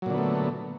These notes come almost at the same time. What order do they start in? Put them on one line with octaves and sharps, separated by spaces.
F#3 A#2 D3 B3 A3